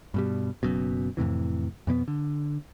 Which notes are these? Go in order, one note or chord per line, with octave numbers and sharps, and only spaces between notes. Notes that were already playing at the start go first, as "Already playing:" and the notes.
G2 B2 G3
F#1 F#2 B2
F2 A2 C3 E3
F2 B2 A#3 B3
D3